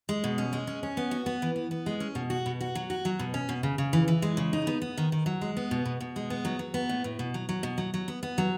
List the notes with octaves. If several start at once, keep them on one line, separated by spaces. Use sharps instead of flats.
G#3
B2
C#4
G#3
C#4
C#4
B3
F#4
B3
E3
B3
B3
G#3
C#4
B2
F#4
B2
F#4
F#3
F#4
F#3
B2
C#4
B2
C#3
C#3
E3
E3
G#3
C#3
D#4
B3
B3
D#3
D#3
F#3
G#3
B3
B2
B2
B2
G#3
B3
F#3
F#3
B3
A2
A2
B2
F#3
F#3
B2
F#3
F#3
B3
B3
F#3